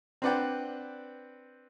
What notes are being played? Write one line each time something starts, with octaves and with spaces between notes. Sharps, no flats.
C4 D4 B4 D5 F#5 G5